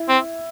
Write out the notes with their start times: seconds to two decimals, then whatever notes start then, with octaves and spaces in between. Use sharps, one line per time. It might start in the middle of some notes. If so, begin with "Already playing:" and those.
Already playing: E4
0.08 C4